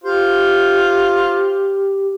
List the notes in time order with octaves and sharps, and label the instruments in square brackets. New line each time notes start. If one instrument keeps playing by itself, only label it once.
[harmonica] F4 C5 [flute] G4